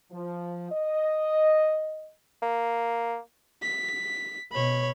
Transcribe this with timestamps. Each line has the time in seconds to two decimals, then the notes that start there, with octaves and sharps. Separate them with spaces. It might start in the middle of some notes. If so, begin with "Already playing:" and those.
0.12 F3
0.72 D#5
2.43 A#3
3.63 B6
4.52 B2 C#5 B5